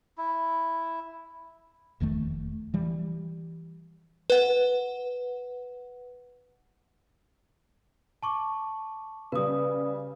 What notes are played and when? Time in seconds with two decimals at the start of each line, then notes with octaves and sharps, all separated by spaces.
0.18 E4
2.00 F1 E2 D#3 A3
2.74 E3 G3
4.30 B4 F#5
8.23 A5 C#6 D6
9.32 C#3 G3 B4 D#6